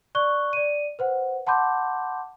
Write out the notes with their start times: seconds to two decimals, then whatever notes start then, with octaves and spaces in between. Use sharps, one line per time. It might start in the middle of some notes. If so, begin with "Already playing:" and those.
0.15 D5 C#6 F#6 G7
0.53 D5 D#7
0.99 B4 C5 F#5
1.47 F#5 A5 B5 C6 D6 G6